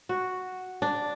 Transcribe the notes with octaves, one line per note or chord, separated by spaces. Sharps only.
F#4
D4